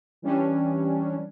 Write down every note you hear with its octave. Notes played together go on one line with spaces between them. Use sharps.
E3 G3 C#4 D4